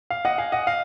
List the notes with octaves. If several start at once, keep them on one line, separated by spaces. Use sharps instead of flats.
F5
D#5 F#5
F5 G#5
D#5 F#5
F5